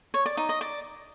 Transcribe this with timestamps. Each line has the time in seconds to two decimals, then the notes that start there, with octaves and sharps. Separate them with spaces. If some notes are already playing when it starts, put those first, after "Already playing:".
0.14 C#5
0.26 D5
0.37 D#4
0.49 D#5
0.61 D5